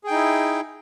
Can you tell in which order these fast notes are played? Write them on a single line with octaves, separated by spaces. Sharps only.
G#4 G5 D#4 E4